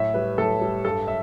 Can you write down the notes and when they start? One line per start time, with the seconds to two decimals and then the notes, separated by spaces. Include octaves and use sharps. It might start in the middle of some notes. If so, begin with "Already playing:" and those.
Already playing: A2 E5
0.14 G3 B4
0.38 A2 A4
0.61 G3
0.85 G2 A4
1.08 E5